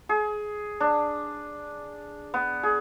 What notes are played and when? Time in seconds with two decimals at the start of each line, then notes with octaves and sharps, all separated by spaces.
0.09 G#4
0.80 D4
2.34 B3
2.63 G#4